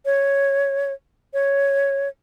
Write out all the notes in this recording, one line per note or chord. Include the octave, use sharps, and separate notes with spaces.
C#5
C#5